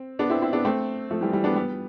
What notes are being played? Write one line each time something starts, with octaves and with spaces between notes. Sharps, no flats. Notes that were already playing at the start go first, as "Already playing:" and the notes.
Already playing: C4
B3 D4
C4 E4
C4 E4
B3 D4
A3 C4
F3 A3
E3 G3
E3 G3
B3 D4
G3 B3